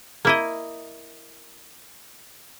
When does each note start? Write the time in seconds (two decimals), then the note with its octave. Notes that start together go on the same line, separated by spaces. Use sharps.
0.25 A#3 E4 D#5